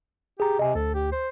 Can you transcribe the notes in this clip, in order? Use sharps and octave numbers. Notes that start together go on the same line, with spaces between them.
G4 G#4 A#5
C3 D#5 G#5
D2 A4
G4
C5